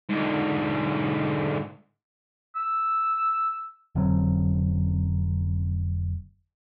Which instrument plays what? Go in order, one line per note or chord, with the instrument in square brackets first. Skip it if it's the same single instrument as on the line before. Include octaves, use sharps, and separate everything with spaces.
[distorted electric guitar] G#2 D3
[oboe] E6
[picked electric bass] F1 D3 F#3 C4